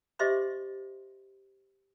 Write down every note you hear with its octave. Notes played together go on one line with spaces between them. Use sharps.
G4 C5 D#5 E5 C6 D6